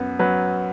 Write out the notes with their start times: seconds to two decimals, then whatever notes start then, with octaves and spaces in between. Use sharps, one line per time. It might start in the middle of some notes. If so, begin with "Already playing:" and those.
Already playing: F#2 B3
0.19 F#3 B4